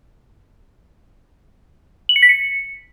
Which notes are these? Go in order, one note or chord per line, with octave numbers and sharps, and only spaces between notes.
F#7
C#7
B6
C#7